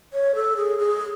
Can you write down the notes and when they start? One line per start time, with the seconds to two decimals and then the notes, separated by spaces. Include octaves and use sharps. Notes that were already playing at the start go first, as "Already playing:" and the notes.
0.13 C#5
0.35 A4
0.57 G#4
0.79 G#4